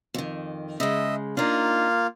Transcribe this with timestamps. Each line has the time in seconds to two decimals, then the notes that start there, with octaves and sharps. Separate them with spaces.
0.14 F2 D#3
0.80 C#3 G#3 D#5 E5
1.37 A#3 D4 D#4 F4 F5